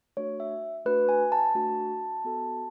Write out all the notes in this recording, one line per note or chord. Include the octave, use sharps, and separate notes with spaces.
A3 D4 F#4 C#5
E5
A3 D4 F#4 B4
G#5
A5
A3 D4 F#4
B3 F#4 A4